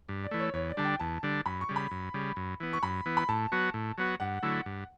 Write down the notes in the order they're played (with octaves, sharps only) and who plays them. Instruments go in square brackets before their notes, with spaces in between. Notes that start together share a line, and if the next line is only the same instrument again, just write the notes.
[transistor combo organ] G2
[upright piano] D5
[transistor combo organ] E3 A3
[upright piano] C#5
[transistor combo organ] E2 [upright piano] C#5
[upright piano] D5
[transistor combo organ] D3 G3 D4 [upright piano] A5
[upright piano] G5
[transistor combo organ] E2 [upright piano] A5
[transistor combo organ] D3 G3 D4
[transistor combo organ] F#2 [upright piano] B5
[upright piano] C#6
[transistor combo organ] C#3 G3
[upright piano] B5
[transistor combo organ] F#2
C#3 G3
F#2
E3 B3
[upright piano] C#6
[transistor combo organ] F#2 [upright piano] B5
[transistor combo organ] E3 B3
[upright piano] B5
[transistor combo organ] A2 [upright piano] A5
[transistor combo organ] F#3 B3 F#4
A2
F#3 B3 F#4
[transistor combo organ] G2 [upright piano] F#5
[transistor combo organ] D3 F#3 A3 E4
G2